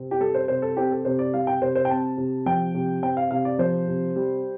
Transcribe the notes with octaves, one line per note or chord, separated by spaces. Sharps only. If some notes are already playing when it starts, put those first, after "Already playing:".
Already playing: C3 C4
G4
G3 A4
C5
C3 C5
A4
C4 G4
A4
C3 C5
D5
G3 F5
G5
C3 C5
C5
G5
C4 A5
C3
F3 G5
C3
C4 G5
F5
C3 F5
D5
F3 C5
C3
G3